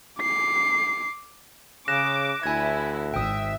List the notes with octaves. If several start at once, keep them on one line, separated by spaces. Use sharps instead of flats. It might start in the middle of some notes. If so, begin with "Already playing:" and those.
D6 C7
C#3 D6 F#6 A#6 E7
D2 E4 G#5 G#6
G#1 E5 G5 D#6